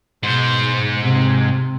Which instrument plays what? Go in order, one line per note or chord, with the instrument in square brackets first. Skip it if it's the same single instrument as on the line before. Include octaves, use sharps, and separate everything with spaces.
[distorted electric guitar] G#2 C5 [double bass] B2
[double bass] C3